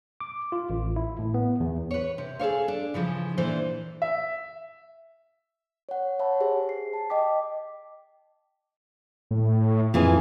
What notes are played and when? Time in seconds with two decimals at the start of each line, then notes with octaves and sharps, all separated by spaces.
0.21 D6
0.52 F4
0.70 A1
0.96 E4
1.19 A2
1.34 B3
1.60 E2
1.91 B4 C#5
2.18 C3
2.39 G#4 A4 C#5 F5
2.68 D4
2.94 C#3 E3 F3
3.38 A#2 E3 D4 A4 C5
4.02 E5
5.89 C#5 F#5
6.19 C#5 E5 F#5 A5 B5
6.40 G4 G#4 C5 E5
6.69 C7
6.93 A5
7.10 D#5 G5 D6 B6
9.31 A2
9.94 F2 E3 F4 G#4